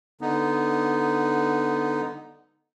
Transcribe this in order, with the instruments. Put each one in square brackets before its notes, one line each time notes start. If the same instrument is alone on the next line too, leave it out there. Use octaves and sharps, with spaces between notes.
[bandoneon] D3 B3 D#4